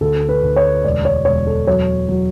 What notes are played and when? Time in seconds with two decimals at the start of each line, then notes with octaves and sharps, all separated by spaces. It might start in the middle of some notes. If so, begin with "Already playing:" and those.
0.01 D2 A4
0.29 B4
0.43 D2
0.56 C#5
0.84 E1 D5
1.05 C#5
1.25 E1 C#5
1.47 A4
1.67 F#3 C#5
2.09 F#3